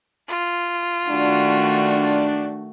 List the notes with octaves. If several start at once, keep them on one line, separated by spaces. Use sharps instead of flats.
F4
D#3 A3 D4 F#4